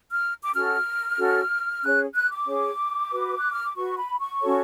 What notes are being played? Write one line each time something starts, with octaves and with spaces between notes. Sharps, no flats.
F6
D6
C#4 F#4 A4 F6
C#4 F#4 A4
C#4 G#4 C#5 F#6
F#6
D6
C#4 G#4 C#5
F#4 B4
F#6
F6
D6
F#4 B4 C#6
B5
C#6
C#4 F#4 A4 C#5